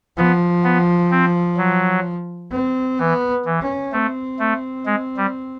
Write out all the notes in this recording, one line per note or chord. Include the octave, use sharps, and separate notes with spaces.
F3 B3
B3
C4
F#3
C4
E3 B3
E3
C#4
A3 C4
A3
G#3
G3